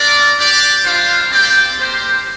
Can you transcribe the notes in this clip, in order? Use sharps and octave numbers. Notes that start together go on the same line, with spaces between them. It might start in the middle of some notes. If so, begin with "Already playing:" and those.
Already playing: A#3 D4 A#4 D5
D4 G4 D5
G3 D4 F4 C5 F5
C4 G4 D5 G5
A#3 G4 C5